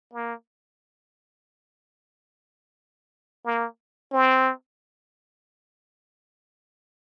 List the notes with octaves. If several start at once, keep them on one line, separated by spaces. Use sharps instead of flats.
A#3
A#3
C4